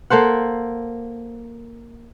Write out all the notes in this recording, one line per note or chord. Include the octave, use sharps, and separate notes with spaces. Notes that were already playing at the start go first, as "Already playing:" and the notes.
A#3 A4 C5 F#5